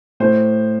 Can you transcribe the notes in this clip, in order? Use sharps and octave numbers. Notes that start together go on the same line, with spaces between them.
A2 C5